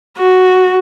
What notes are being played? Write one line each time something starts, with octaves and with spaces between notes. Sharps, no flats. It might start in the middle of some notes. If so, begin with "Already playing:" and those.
F#4